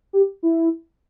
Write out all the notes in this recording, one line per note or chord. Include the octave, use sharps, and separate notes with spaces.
G4
E4